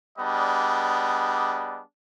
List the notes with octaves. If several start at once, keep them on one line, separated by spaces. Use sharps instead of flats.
G3 B3 D4 G#4 D#5